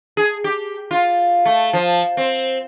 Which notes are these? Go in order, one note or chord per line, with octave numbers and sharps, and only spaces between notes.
G#4
G4
F4
A3
F3
C4